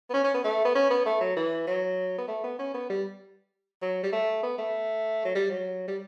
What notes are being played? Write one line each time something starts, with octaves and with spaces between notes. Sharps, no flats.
B3
C#4
C#4
B3
A3
B3
C#4
B3
A3
F#3
E3
F#3
B3
A3
B3
C#4
B3
G3
F#3
G3
A3
B3
A3
F#3
G3
F#3
G3